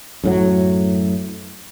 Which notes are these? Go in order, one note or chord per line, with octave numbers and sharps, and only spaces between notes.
F#2 A2 F#3